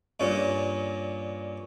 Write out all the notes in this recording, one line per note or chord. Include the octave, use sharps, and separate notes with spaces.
G2 A#2 C#4